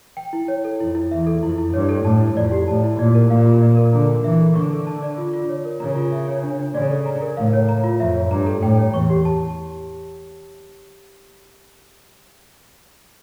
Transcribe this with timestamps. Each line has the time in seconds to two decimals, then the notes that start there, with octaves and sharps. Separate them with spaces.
0.17 G5
0.33 E4
0.48 C#5
0.65 A4
0.80 F2 E4
0.95 E4
1.11 E2 E5
1.27 A4
1.42 F2 E4
1.58 E4
1.74 G2 C#5
1.89 A4
2.05 A2 A5
2.21 E4
2.36 F2 D5
2.52 G4
2.68 A2 A5
2.84 E4
2.99 A#2 D5
3.15 A#4
3.30 A#2 F5
3.46 F4
3.62 D5
3.77 A#4
3.93 D3 A#5
4.09 D4
4.24 E3 E5
4.40 A4
4.56 D3 C#6
4.71 A4
4.87 A5
5.02 D5
5.18 F4
5.33 F4
5.49 C#5
5.65 A#4
5.80 C#3 A#5
5.96 F4
6.12 E5
6.27 C#5
6.43 D4
6.59 D4
6.75 C#3 D5
6.90 A4
7.06 A#5
7.21 A#4
7.37 A2 F5
7.53 C#5
7.69 A#5
7.84 F4
8.00 F2 E5
8.15 C#5
8.31 G2 A#5
8.46 A4
8.62 A2 G5
8.79 C#5
8.94 E2 C#6
9.10 G4
9.25 A5